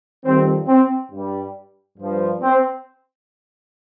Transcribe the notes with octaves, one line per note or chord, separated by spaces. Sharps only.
F2 D#3 G3 C4
C4
G2
G3
G2 F3
C4